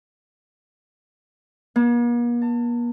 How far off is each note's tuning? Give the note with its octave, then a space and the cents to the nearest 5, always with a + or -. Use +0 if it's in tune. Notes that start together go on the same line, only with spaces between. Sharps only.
A#3 +45
A5 +35